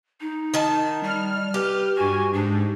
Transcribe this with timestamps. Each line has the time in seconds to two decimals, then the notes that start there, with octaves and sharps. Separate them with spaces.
0.21 D#4
0.54 D#3 A5
1.03 G3 F6
1.54 G4 B4
1.97 G2 F#4 G#5
2.33 G#2 D4